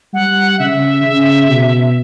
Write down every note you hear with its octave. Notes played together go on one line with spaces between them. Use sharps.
G3 F#5
C#3 E5
C#3
B2